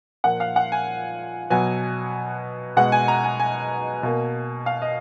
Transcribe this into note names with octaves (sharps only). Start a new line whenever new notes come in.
A#2 F3 A#3 F#5
F5
F#5
G#5
B2 F#3 B3 G#5
B2 G#3 B3 F#5
G#5
A#5
G#5
G#5
B2 A#3
F5
D#5